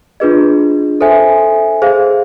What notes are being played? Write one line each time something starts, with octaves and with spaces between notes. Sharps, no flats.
D4 F4 G#4 B4 D#5
A4 C5 E5 G#5
G#4 C5 F5